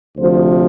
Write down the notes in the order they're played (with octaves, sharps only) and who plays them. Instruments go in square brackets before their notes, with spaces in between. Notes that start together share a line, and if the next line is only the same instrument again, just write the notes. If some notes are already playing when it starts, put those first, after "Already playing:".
[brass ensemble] D2 C3 F3 C5